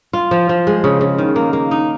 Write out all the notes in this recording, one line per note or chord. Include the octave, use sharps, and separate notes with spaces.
F4
F3
F3
G#3
C#3
C#3
D#3
A#3
A#3
D#4